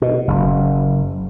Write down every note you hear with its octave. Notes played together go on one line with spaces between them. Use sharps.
B2
F#1